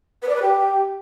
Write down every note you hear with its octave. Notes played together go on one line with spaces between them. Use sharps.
B4
D5
B4
G4